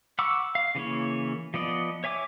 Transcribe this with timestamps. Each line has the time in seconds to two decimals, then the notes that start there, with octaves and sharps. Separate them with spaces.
0.19 F#5 B5 C#6 D6 E6
0.55 F5
0.75 C#3 E3 A#3 C#5
1.54 F3 B3 D5 D#5
2.04 C#5 E5 G#5 D6